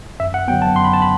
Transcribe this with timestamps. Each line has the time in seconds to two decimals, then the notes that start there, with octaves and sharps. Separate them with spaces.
0.20 F#2 E5
0.34 F#5
0.48 D3 F#3 B3 G5
0.62 A5
0.75 F#2 C6
0.85 B5
0.93 A5
1.02 B5